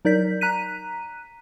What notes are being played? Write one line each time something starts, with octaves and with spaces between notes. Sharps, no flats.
F#3 D#4 A#4 D5 G6 B6
A#5 F#6 B6 D#7